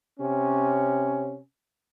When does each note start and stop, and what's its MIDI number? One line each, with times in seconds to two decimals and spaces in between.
0.19 1.38 48
0.19 1.38 61